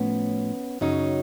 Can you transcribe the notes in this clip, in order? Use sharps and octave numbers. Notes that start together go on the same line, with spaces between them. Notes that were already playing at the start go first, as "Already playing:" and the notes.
Already playing: A2 F3 A3 B3 C#4
F#2 C#3 F#3 C#4 D#4